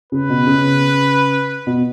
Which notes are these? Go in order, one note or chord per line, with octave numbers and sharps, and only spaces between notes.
C#3 B4
B2
C#3
B2